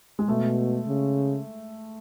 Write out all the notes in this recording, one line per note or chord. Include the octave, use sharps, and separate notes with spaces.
G#3
B2 A3
C#3